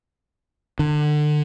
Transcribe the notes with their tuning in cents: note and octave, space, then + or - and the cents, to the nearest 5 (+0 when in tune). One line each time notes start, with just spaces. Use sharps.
D3 +30